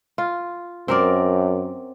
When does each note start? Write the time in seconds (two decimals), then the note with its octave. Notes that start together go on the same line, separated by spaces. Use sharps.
0.18 F4
0.88 F#2 C4 A#4 D5